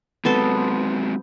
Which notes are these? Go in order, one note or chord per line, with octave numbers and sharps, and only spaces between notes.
F#3 G#3 B3 C4 A4 C5